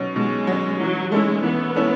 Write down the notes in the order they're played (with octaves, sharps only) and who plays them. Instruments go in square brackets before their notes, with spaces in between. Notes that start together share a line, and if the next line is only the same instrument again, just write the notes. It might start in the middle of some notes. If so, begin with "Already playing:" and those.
Already playing: [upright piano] B2 F#3 C#4
[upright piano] B2 [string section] G#3
[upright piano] F#3 C#4
[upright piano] E3 [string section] F#3
[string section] G#3 [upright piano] A3 C#4 E4
[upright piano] E3 [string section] B3
[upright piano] A3 C#4 E4